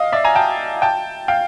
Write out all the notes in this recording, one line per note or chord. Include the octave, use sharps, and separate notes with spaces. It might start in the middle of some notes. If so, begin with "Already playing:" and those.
Already playing: D#5 F5
D5 E5
G#5 A#5
G5 A5
G5 A5
F5 G5